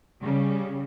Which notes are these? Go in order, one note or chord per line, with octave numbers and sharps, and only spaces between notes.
C#3 G3